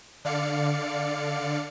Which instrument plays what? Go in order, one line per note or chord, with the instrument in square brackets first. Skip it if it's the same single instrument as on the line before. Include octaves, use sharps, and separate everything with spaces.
[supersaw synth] D3 D5 F5 C#7